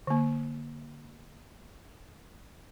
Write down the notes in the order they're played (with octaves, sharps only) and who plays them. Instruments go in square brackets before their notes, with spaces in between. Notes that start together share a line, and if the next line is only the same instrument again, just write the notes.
[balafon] D3 A#3